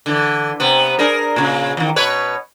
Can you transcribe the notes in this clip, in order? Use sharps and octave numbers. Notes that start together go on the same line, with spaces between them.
D3 E3
C3 B3
D4 G#4 A#4
A#2 C#3
E2 D#3
B2 B4 C#5